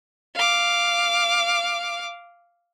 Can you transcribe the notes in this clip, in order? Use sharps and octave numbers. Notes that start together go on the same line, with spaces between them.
F5 D6